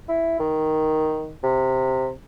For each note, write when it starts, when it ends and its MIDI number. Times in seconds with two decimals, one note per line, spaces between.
0.09 0.36 64
0.39 1.33 51
1.43 2.11 48